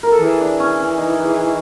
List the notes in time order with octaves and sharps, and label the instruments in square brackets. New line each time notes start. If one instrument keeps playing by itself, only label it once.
[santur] A#4
A4
[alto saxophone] E3 [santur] G#4
[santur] D4
C#4
C#4
D#4
G#4